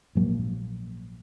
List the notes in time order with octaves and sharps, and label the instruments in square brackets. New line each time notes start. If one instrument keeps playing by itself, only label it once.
[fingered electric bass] A#1 G#2 F#3 A#3